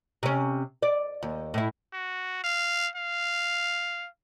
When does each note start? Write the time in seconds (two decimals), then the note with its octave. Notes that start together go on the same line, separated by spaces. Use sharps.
0.23 C3 C#4
0.82 D5
1.23 D#2
1.54 A2 E4
1.93 F#4
2.44 F5
2.96 F5